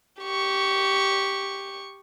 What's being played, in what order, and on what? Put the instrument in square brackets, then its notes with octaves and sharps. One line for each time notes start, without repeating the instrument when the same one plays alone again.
[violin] G4 C#6